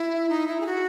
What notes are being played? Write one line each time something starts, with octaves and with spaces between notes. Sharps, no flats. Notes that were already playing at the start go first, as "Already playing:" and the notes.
Already playing: E4
D#4
E4
G#4
F#4